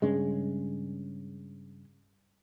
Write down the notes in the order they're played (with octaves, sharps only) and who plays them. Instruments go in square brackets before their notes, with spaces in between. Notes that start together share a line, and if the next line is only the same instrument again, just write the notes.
[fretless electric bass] G2 C#3 G#3